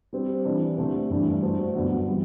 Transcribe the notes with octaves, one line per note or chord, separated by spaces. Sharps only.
G3 C4 G4
E3 G3 D4
D3 A3 C4 G4 C5
G2 E3 A3 D4
A3 D4 F#4 C5
G2 D3 F#3 B3
E3 G3